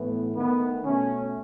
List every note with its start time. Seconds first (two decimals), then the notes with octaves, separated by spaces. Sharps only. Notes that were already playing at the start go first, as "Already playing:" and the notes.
Already playing: A2 E3 B3
0.36 D#3 A3 B3
0.84 B2 A3 C#4